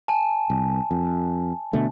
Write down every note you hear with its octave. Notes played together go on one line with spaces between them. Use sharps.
G#5 A5
C2
F2
B2 D3 A3